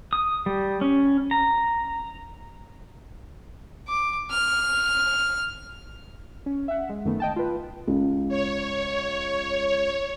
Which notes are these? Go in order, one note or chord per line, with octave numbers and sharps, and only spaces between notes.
D#6
G3
C#4
A#5
D6
F6
C#4
E5 F#5
G#3
F#2 D#3 A3 B3
D#5 G5 A5
F4 B4
C#2
C#5